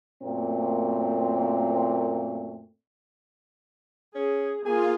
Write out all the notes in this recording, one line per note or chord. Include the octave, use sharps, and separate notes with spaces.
F#2 A#2 A3 A#3 C4
C#4 G#4
A#3 F4 G#4 G#5